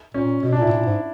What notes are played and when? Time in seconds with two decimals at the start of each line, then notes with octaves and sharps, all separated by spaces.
0.14 A#2 C#4
0.43 B2 C#4
0.52 D4
0.57 A#2 E4
0.67 A2
0.71 A#2
0.86 G#2